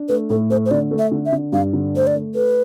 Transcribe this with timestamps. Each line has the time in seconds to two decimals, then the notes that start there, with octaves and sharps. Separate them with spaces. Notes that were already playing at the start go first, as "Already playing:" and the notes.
Already playing: D4
0.09 A3 B4
0.30 A2 A4
0.50 A3 C5
0.66 C5
0.71 D3 D5
0.91 A3
0.99 E5
1.11 D3
1.26 E5
1.32 D3
1.52 G2 F5
1.73 D3
1.94 A3 C5
2.07 D5
2.15 A3
2.35 A4 B4